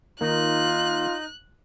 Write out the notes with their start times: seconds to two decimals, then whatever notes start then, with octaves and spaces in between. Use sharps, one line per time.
0.21 D#3 A#3 D#4 F4 F#6